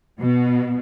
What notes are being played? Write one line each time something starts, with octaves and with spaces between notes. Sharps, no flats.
B2